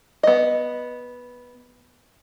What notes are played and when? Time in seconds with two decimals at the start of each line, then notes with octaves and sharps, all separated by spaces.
0.23 B3 D#5